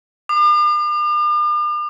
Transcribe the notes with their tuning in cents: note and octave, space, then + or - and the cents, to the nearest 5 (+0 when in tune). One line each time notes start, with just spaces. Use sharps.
D6 +45